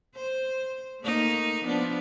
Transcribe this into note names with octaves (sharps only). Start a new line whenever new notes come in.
C5
A3 A#3 D#4
F3 B3 D4